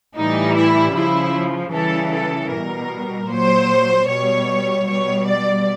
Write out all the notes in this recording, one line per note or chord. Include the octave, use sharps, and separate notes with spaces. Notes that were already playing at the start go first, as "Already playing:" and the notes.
A2 E3 G3 D#4
E4
C#3 F3 E4
C#3 E3 G3 A4
A4
B2 G3 A#4
A#2 F#3 C5
B2 G3 C#5
B2 G3 C#5
D5